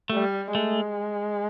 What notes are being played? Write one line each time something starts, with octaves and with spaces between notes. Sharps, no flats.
G3 A3
G#3 A3